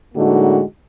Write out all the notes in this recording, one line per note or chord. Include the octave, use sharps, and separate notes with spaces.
A2 D3 G#3 A#3 D#4 F#4